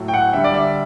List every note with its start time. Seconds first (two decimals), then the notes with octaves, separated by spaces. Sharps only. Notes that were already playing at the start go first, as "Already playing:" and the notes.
Already playing: A2 F#3 A3
0.08 G5
0.14 F#5
0.33 D3 G3 E5
0.44 D5
0.54 E5